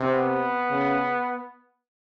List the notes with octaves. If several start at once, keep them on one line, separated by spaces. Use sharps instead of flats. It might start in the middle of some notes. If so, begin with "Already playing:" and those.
Already playing: C3
B3
C#3